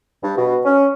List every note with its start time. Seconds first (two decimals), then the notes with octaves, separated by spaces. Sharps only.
0.23 G2
0.37 B2
0.65 C#4